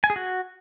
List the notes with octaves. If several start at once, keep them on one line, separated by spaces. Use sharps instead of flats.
G#5
G#4
F#4